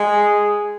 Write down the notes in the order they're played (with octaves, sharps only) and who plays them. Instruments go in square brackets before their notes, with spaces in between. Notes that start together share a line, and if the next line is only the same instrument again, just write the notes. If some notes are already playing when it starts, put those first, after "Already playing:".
Already playing: [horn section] G#3 [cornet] G#4